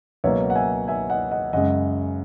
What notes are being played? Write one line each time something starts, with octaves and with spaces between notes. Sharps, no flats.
C#2 B2 F#3 A#3 C#5 E5
F#5
E5 G#5
E5 G#5
D#5 F#5
D#5 F#5
F#2 C#3 G#3 D#5 F#5